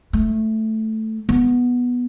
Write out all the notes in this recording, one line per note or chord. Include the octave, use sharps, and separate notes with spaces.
A3
B3